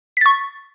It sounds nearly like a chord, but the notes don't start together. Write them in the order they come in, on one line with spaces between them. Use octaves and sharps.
B6 A6 C#6